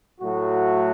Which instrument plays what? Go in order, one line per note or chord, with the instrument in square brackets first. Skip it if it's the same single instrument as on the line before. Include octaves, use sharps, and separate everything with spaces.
[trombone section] A2 F#3 A3 F#4